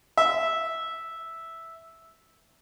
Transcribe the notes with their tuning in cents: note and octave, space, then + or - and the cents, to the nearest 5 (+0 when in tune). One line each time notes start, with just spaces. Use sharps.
E5 -5